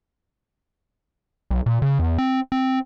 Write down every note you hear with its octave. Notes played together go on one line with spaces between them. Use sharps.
B1
A#2
C#3
E2
C4
C4